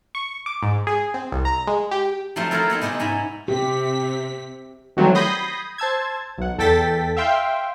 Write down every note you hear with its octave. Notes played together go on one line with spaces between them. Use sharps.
C#6
D6
G#2
G#4
C4
C2
A#5
G#3
G4
F3 F#3 A3 C4 F4 C5
E4 A4 A#4 C#5 F5 F#5
A3 B3 C4 D#4
C3 G#3 B3 E4 B4
G#2 C#4 E4 E5 A#5 B5
C3 C4 G4 B6
D#3 E3 F#3 G3 A3 C4
B5 D#6 G6 G#6 A#6 C7
C5 A5 E6 G#6
B1 F#5
E2 A4 G5 A6 B6
E5 F5 G5 C6